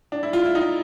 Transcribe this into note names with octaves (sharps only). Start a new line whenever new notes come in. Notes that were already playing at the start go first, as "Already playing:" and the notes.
D4
E4
F4
E4
D#4